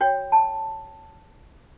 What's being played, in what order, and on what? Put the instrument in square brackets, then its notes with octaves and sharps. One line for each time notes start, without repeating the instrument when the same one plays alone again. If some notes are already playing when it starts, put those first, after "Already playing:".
[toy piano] F#4 C#5 G5
A5